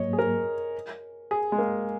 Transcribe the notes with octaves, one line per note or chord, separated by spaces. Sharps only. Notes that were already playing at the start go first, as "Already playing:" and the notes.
Already playing: G#2 F#3 A#3 C#5 D#5
G#4
A#4
G#4
G#3
A#3